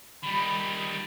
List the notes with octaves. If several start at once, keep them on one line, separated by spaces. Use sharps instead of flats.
D#3 G3 B5